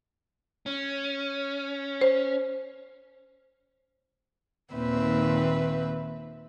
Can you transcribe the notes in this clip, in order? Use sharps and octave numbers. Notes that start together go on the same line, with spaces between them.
C#4
C5
D#2 A#2 D#3 C4 B4 E5